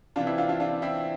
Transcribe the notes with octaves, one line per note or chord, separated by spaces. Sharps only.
C3 E3 D4 F4
C4 E4
D4 F4
D4 F4
D4 F4
C4 E4